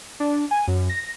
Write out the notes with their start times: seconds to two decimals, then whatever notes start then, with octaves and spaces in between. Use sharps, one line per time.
0.20 D4
0.51 G#5
0.68 F#2
0.89 A#6